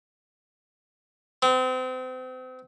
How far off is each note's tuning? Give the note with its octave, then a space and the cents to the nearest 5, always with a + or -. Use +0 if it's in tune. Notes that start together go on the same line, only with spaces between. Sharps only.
C4 -35